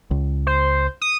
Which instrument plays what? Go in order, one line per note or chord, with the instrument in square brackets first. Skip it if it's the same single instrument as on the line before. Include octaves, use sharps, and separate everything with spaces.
[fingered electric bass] C#2
[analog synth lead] C5
D#6